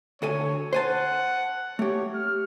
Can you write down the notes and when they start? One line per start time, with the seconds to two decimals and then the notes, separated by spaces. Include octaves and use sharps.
0.22 D2 A4 C#5 G#5
0.73 C5 F#5 G#5 A5
1.79 A3 G4 C#5
2.14 F6